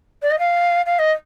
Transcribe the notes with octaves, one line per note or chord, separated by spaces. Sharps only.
D5
D#5
F5
F5
D#5